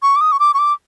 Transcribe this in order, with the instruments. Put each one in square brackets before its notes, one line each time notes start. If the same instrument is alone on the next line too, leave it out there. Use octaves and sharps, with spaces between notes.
[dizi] C#6
D6
D#6
C#6
D6
C#6
D6